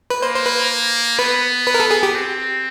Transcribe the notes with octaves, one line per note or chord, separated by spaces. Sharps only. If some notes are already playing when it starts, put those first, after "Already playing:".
B4
A#3 C5
C5
B4
B3 B4
B4
A#4
A4
G#4
G4
C4